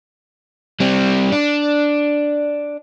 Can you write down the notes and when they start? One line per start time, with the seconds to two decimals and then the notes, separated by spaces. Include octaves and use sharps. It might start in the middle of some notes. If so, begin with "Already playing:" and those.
0.80 G3 C4
1.32 D4